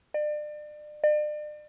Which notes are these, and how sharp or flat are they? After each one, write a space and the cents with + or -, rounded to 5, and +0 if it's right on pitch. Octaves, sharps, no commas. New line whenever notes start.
D5 +35
D5 +40